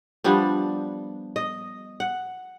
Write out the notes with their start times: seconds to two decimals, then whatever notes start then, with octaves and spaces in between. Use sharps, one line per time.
0.24 F3 G3 B3 D4
1.36 D#5
2.00 F#5